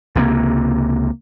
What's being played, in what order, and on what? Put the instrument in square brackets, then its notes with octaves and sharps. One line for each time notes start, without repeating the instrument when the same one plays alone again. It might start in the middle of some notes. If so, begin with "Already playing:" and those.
[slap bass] C#2 C3 F#3 A#3